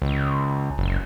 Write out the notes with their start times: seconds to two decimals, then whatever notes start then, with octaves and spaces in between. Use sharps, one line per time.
0.02 C#2
0.78 F#1